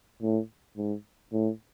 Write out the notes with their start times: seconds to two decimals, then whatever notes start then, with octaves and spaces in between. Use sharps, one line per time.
0.22 A2
0.77 G#2
1.33 A2